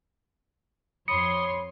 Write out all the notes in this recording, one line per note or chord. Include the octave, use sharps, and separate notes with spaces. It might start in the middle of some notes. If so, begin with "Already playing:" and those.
F2 C#5 B5 C6 D#6 C#7